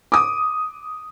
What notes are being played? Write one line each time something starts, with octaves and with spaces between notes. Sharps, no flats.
D6 D#6